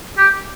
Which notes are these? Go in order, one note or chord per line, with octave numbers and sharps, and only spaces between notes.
G4